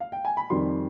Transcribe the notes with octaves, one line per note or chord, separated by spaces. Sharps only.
F5
G5
G#5
B5
F2 D#3 G3 C6